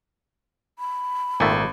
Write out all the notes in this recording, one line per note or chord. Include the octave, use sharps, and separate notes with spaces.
B5
G#1 A#2 D#3 A3